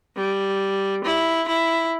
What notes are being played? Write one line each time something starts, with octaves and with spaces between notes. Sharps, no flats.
G3
E4
E4